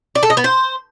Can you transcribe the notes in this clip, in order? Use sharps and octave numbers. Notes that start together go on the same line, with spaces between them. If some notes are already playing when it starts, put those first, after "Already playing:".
D5
A4
D#5
B3
C5